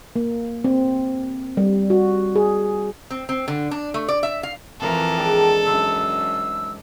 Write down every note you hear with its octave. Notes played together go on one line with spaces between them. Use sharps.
A#3
C4
G3
F#4
G#4
C4
C4
D3
D4
A3
D5
E5
F5
F2 E3 A4 A#4
G#2 D4 G5 A5
F#2 E6